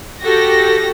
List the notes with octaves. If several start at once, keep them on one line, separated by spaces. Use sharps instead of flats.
F#4 G4 A4 A#6